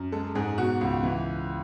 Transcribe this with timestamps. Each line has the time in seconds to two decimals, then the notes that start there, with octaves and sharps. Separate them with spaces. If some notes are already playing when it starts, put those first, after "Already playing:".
Already playing: F#2
0.12 G#3 A4
0.35 G#2 G#4
0.58 B2 F#4
0.81 C#2
1.03 E3